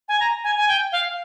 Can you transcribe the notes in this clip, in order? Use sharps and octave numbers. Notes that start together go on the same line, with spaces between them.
G#5
A#5
G#5
G#5
G5
F5